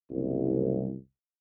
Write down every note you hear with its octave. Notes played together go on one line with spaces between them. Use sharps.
F#1 C2